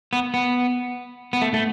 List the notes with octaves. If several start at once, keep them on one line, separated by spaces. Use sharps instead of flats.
B3
B3
B3
A3
A3